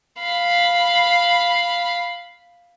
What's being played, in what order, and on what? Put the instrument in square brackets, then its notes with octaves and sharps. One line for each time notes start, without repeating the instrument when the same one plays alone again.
[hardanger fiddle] F5 B5